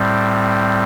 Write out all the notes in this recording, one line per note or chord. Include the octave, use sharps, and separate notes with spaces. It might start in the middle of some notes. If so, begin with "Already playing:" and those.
Already playing: A2 G3 C4